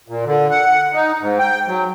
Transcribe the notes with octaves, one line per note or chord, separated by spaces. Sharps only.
A#2
D3
F#5
D#4
G#2
G5
F#3